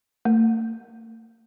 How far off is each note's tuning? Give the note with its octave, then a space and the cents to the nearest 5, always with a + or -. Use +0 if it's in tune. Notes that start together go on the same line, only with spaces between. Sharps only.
A3 +45